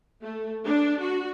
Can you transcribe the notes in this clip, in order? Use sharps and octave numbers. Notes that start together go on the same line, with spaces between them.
A3
D4
F#4